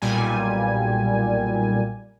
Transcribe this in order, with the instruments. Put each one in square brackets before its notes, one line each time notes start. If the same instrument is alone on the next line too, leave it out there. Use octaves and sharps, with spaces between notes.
[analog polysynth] B1 A#2 G3 G#5